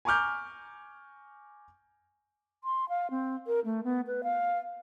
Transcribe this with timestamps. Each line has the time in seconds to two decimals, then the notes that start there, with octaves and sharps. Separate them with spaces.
0.05 G#5 A#5 C#6 D6 F6 G6
2.64 C6
2.89 F5
3.11 C4
3.47 A#4
3.65 A3
3.84 B3
4.07 B4
4.23 F5